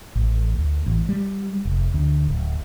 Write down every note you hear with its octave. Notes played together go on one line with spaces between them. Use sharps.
A1
D2
A1
G3
F1
D2
D1